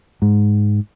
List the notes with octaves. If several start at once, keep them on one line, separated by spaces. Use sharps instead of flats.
G#2